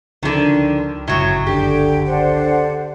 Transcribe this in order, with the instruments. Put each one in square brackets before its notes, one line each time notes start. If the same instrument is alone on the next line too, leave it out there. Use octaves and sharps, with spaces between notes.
[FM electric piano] C#2 F3 [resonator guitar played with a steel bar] D3 D#3
[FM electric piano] G1 C#2 F#2 [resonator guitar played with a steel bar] A2 F#3
[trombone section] D3 [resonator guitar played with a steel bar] G4 [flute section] G5
[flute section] D4 C5 F#5